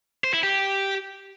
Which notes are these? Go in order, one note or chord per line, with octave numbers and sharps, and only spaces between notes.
C5
E4
G4